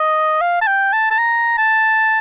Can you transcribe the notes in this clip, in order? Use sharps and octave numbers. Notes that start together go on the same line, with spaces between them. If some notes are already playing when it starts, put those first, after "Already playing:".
Already playing: D#5
F5
A5
G5
A5
A5
A#5
A5